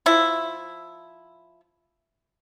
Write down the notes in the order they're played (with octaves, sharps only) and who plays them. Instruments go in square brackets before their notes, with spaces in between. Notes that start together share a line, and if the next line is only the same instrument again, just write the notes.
[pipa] F3 E4